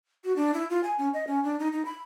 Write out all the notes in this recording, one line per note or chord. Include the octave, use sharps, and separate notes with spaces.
F#4
D4
E4
F4
G#5
C#4
D#5
C#4
D4
D#4
D#4
B5